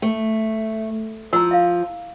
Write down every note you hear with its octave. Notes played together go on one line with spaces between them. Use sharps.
A3
F3 A#5 E6
E5 F5